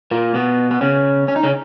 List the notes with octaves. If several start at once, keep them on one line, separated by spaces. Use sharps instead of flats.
A#2 A#3
B2 B3
B3
C#3 C#4
C#4
D#4
C#3 C#4